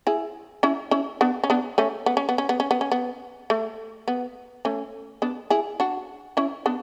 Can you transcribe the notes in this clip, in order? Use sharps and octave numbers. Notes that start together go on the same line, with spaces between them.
E4 G#4
C#4 E4
C#4 E4
B3 D4
C#4
B3 D4
A3 C#4
B3
C#4
B3
C#4
B3
C#4
B3
C#4
B3
A3
B3
A3 C#4
B3 D4
E4 G#4
D4 F#4
C#4 E4
B3 D4